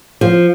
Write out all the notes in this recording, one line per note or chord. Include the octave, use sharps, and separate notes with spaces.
F3